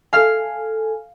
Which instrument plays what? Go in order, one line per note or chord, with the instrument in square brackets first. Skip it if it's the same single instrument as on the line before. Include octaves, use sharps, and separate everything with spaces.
[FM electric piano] A4 G#5 [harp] F5 F6